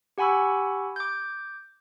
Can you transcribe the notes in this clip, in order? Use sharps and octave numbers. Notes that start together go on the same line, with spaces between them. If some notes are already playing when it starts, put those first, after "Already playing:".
G4 F#5 G#5 B5 C#6 E6
D6 G6